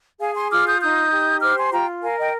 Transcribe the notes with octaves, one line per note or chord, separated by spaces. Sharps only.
G#4 F5 G#5
G#5 C6
F4 D6 F6
D#6 G6
D#4 D#6 G6
G4
C5 D6 F6
G#5 C6
F4 G5 A#5
A#4 F5 G#5
D#5 G5